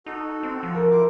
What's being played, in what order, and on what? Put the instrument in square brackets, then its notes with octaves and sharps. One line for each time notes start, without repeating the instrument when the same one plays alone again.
[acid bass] D#4 [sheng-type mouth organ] F#4 A4
[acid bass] C4
F3
[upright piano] A#4
[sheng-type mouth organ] E4 C5 D6